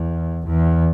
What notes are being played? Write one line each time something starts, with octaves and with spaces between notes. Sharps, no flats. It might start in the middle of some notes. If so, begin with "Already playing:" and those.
Already playing: E2
E2